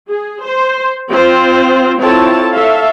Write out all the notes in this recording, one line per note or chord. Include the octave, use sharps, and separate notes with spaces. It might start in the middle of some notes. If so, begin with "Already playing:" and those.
G#4
C5
C4 F4 C5
C4 E4 F4 A4 C#5 A5
A4 C#5 E5 F5